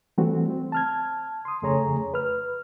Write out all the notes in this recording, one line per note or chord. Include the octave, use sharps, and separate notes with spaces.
E3 G3 A3 C4 F#4
C4
A5 F6 G#6
C6 D#6
F2 C#3 A3 G#4 C#5 A#5
B4 F6